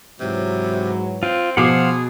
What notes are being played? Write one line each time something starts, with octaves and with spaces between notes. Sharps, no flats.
G#2 C3 E3 F#3
C4 F4
B2 F3 G#4 C5 F5 F#5 D6